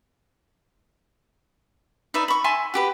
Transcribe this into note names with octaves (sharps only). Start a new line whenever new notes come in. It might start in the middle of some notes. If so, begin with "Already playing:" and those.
D#4 B4 D5 E5
B5 C#6
E5 G#5 A5 C6
F#4 G4 B4